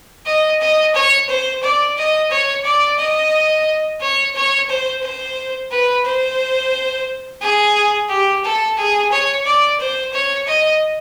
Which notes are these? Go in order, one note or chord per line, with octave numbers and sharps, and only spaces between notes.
D#5
D#5
C#5
C5
D5
D#5
C#5
D5
D#5
C#5
C#5
C5
C5
B4
C5
G#4
G4
A4
G#4
C#5
D5
C5
C#5
D#5